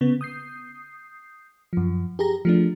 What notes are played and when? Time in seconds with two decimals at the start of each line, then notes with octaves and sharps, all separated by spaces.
0.01 C#3 B3
0.21 D#6 G6 C7
1.73 F#2 F3
2.19 G4 G#4 A#5 A#6
2.45 F3 A3 D4